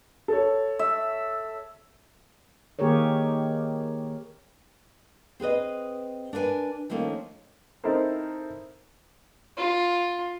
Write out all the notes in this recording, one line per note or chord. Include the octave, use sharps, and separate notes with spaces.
A4 C#5
E5
D#3 A#3 G4 G#4 A#4 C#5
C4 G#4 B4 D#5
D4 A#4 B4 F5 G#5
D#3 F3 A3 A#3 C#4
C4 D#4 E4 A4 A#4 C5
F4